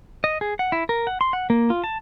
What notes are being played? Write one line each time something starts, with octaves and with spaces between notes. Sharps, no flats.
D#5
G#4
F#5
E4
A#4
F#5
C6
F#5
A#3
F4
A5